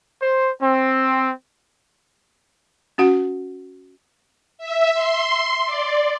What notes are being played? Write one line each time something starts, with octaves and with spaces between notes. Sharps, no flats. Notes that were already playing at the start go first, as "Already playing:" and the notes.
C5
C4
C#4 F#4 F#5
E5
C6
D5